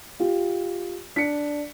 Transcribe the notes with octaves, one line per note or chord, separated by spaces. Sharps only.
F4 G4
D4 B6 C#7